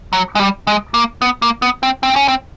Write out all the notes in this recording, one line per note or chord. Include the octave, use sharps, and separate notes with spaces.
F#3
G#3
G3
G#3
A#3
B3
A#3
B3
C4
C4
C#4
C4